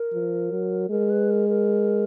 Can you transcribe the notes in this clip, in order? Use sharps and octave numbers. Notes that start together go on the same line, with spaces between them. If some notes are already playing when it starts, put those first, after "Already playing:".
Already playing: A#4
F3
F#3
G#3 A#4
B4
A#4
A#4